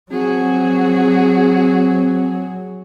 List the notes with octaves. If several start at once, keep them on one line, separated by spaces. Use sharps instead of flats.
F#3 C4 F#4 G#4